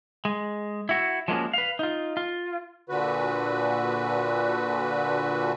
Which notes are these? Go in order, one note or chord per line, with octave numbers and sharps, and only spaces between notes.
G#3
E4 F#4
F3 G#3 A#3 C#4 F#4
B4 F5
D#4 F4
F4
A#2 D3 F#4 B4